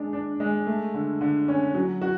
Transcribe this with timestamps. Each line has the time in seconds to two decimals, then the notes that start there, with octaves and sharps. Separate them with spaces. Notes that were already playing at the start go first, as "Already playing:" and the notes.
Already playing: G#3 D4
0.13 D4
0.40 G#3
0.67 A3
0.94 D3
1.21 D3
1.48 C#4
1.75 F#3
2.01 F#4